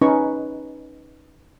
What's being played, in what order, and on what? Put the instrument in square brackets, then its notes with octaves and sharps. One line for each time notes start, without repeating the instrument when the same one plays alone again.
[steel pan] C#4 D#4 B4 C#6